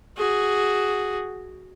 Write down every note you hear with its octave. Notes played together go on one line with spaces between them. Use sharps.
F#4 G#4